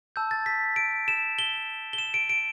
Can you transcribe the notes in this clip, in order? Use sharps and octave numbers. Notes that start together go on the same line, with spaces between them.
A5 E6 G6
A6
B6
D7
E7
G7
G7
E7
D7
D7